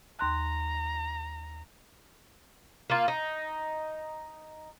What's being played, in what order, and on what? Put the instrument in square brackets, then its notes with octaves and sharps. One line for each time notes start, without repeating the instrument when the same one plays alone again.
[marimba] D#2 C6 F#6 [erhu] A#5
[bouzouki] A#3 F4
D#4